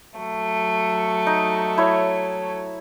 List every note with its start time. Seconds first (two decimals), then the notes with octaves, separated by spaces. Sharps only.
0.18 F#3 A3
1.27 D#4
1.78 E4 C#5